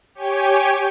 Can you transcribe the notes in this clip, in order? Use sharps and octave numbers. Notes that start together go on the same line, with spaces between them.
G4 C#5 G5 G#5